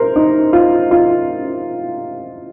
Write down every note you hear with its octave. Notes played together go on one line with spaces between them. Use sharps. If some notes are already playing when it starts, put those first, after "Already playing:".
Already playing: A#4 C5
D#4
F4
F4